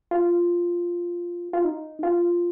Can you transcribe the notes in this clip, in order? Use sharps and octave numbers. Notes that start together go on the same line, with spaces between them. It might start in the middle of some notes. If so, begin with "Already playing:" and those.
F4
F4
D#4
F4